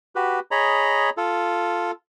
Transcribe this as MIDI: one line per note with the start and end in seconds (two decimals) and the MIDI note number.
0.15 0.39 66
0.15 0.39 67
0.15 0.39 71
0.51 1.10 68
0.51 1.10 73
0.51 1.10 75
0.51 1.10 82
0.51 1.10 83
1.17 1.91 65
1.17 1.91 69